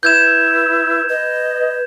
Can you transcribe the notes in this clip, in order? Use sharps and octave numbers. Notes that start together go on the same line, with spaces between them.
E4 B4 G6 G#6 E7
B4 D#5